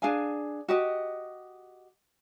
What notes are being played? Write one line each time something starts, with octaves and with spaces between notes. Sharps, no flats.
D4 G#4 F5 G#5
F#4 G4 D#5